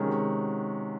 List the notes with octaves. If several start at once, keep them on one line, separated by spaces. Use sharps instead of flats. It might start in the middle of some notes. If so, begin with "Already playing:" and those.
Already playing: C3 D#3 G#3 C#4 F#4